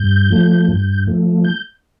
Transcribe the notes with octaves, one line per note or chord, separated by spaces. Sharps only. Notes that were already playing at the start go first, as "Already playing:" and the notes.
Already playing: G2 G6
F3 A3
G2
F3 A3
G6